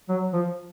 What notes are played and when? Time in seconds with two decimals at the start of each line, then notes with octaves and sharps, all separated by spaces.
0.09 F#3
0.33 F3